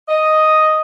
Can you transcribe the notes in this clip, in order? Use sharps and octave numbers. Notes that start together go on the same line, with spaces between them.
D#5